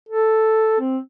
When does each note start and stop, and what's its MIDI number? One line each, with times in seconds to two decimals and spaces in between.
0.09 0.79 69
0.81 0.98 60